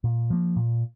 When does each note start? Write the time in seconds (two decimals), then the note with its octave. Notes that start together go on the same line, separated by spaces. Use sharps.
0.04 A#2
0.30 F3 A#3
0.56 A#2